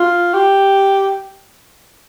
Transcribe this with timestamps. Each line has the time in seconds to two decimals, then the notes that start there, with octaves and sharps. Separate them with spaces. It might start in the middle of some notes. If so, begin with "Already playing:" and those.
Already playing: F4
0.34 G4